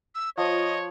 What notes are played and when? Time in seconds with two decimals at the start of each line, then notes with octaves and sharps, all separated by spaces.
0.15 E6
0.37 F3 C#5 D#5